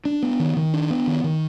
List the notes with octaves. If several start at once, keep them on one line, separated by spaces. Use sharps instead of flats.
D4
B3
D#3
D#3
D4
B3
D#3
D#3